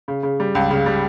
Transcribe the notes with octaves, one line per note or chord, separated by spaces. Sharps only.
C#3
C#3
G3
C#2
C#3
G3